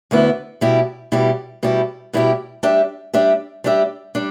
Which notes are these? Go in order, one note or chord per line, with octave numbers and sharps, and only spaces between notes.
D2 D3 B3 E4
B2 G3 E4 G4
B2 G3 E4 G4
B2 G3 E4 G4
B2 G3 E4 G4
G3 D4 G4 E5
G3 D4 G4 E5
G3 D4 G4 E5
G3 D4